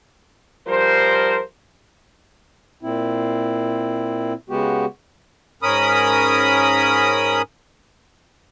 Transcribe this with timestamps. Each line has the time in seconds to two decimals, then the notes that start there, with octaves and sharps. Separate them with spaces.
0.68 F3 G3 A#4 C5
2.83 A#2 C4 E4
4.50 C#3 G#3 B3 F#4 G4
5.63 G#2 C#4 A#4 B5 D#6